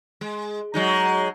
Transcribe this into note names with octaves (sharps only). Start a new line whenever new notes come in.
G#3
F#3 G#3 D#4